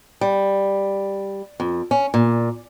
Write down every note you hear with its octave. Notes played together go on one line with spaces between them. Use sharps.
G3
F2
C#4
A#2